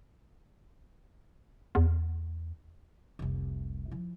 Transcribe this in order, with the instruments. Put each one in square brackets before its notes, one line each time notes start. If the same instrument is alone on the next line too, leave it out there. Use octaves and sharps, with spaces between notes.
[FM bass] E2
[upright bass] F1 C2
F3 E4